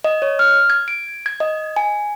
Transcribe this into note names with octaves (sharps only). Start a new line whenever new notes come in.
D#5
C#5
F6
G#6
D7
G#6
D#5
G#5